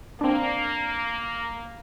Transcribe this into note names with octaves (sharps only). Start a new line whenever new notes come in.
A#3 C4 D4